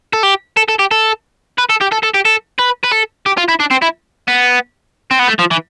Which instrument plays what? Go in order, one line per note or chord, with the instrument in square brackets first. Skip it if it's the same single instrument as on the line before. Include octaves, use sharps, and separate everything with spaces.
[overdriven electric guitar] A4
G4
A4
A4
G4
A4
B4
A4
G4
A4
A4
G4
A4
B4
B4
A4
G4
F4
E4
D4
C4
E4
B3
C4
B3
A3
F3
E3